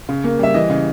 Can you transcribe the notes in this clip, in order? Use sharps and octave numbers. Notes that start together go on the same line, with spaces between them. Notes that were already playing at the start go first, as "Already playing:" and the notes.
C#3
A#3
G3 E5
E3 D#5
C#3